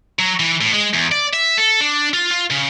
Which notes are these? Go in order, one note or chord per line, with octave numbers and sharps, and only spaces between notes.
F#3
E3
A2
G#3
E2
D5
E5
A4
D4
F4
F4
C#3